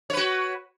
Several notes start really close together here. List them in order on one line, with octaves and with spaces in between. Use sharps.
C#5 B4 F#4